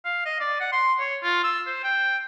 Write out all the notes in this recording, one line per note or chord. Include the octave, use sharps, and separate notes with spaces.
F5
D#5
D5
F#5
C6
C#5
F4
E6
C5
G5